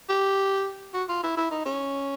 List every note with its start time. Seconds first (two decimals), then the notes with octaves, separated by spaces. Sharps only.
0.09 G4
0.94 F#4
1.09 F4
1.23 E4
1.37 E4
1.51 D#4
1.66 C#4